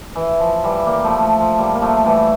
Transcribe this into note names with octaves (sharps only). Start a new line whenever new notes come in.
E3
F3
E3 G3
G3 A#3
F3 A3
F3
F3
G3 A#3
A#3
F3 A3
E3 G3